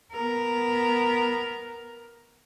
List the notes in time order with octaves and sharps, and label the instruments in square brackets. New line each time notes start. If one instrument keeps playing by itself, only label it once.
[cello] B3 A#4